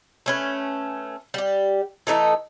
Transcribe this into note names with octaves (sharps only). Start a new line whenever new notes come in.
A3 C#4 B4
G3 G4
E3 A3 D#4 A4